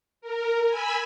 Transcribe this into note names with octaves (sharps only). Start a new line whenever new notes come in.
A#4
G#5 B5 E6